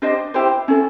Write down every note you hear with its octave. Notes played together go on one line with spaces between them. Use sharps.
D4 G4 C5 D#5
E4 G4 C5
C#4 E4 A4